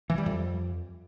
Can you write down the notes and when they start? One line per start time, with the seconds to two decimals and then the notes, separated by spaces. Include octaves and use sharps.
0.10 E3
0.18 G3
0.26 F2